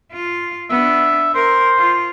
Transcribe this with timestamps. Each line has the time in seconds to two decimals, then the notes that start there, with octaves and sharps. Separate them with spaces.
0.12 F4
0.70 B3 D4 E5
1.34 A#4 C5
1.78 F4